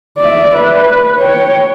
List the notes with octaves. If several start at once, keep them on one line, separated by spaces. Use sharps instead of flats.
D5 E5
B4
C#5 G5